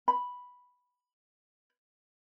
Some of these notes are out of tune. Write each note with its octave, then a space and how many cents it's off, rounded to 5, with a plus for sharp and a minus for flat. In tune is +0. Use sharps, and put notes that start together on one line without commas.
B5 -5